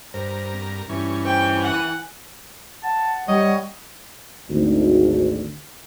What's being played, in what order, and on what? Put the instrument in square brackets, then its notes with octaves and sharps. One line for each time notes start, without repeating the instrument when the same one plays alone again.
[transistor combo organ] G2 A#4 [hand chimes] C5
[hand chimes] C4
[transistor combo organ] G2 C#4 [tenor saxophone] E3
[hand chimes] C5 G#5 [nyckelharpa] G5
[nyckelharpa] F#5 [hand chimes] G#5 F#6
[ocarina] F#5 [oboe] A5
[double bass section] G3 [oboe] C#5 [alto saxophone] D#5
[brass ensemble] G#1 D2